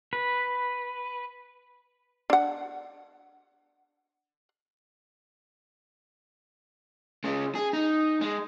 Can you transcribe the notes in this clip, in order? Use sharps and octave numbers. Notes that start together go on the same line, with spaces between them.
B4
D4 F#5
C#3 G#3
G#4
D#4
G#3